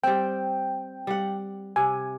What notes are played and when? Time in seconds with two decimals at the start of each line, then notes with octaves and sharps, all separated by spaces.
0.04 G3 C4 G5
1.07 G3 F#5
1.76 C3 G#5